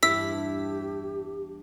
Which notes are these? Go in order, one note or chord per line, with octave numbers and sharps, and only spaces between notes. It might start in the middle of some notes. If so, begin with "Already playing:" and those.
E2 G2 E4 G4 E6 B6